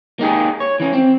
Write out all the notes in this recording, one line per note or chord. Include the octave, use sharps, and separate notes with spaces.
A#3 D#4 G4 G#4
C#5
E3 C#4
C4